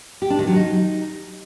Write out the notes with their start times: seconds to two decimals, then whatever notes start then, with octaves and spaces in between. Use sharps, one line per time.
0.22 G4
0.30 D4
0.39 D#3
0.47 F#3
0.56 D#4